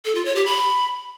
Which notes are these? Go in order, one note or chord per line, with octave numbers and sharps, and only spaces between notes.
A4
F4
C#5
G4
B5